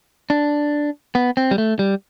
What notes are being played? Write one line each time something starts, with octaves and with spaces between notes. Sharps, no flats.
D4
B3
C4
G3
A3
G3